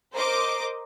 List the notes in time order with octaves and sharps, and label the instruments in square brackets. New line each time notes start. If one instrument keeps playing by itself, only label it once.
[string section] A#4 C5 D#5 D6